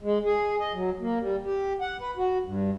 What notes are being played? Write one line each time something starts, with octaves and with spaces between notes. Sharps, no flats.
G#3
G#4
D#5
F#3
A#3
G3
G4
F#5
B4
F#4
G2